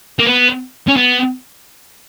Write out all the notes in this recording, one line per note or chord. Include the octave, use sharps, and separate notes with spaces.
A#3
B3
C#4
B3